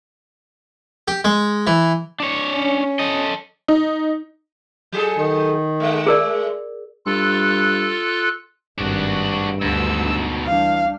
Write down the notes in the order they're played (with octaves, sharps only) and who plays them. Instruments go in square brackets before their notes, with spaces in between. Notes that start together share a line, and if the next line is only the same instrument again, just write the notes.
[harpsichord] G4
G#3
E3
[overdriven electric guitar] D4 C#5
[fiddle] C#4
[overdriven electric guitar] A4 D#5
[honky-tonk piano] D#4
[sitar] F#3 G#4 A4
[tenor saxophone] D#3
[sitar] G#3 A3
[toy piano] G#4 A#4 D5
[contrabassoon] G2 [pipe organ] F4 A4 F#6
[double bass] G#1 [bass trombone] G2 [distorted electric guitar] D4 F#4
[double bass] D2 [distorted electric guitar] G#2 B2 [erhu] E6
[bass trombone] E3 [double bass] G3 D4 [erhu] F5